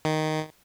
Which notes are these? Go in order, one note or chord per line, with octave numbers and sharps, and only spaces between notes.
D#3